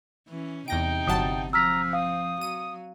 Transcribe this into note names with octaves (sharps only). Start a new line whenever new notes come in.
E3 C#4
E2 C3 D#4 G5 A#6 D7
G1 F#3 F#5 A5 D#6
F3 C4 A#5 E6 F6 B6
F5 D#6
F#3 D#7